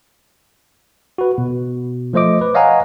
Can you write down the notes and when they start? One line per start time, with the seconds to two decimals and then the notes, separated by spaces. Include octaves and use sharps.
1.18 F#4 B4
1.38 B2
2.13 F3 A3 C5 D#5 D6
2.41 B4
2.54 C#5 D#5 F5 F#5 G#5 A#5